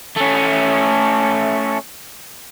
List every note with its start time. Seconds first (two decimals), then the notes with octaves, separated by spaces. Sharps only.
0.16 A3 C#4